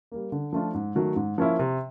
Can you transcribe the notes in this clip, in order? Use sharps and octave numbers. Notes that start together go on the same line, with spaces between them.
G3 A#3
D3
F3 A3 D4 F4
G#2
D#3 F#3 A3
G#2
F3 A#3 C#4 E4
C3